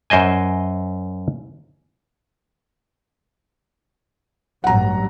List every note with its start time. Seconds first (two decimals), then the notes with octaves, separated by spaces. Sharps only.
0.10 F#2 C5 D#5 G#5
4.64 A1 G2 F#3 F#5 A#5